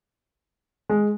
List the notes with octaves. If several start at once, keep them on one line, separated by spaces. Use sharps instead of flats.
G#3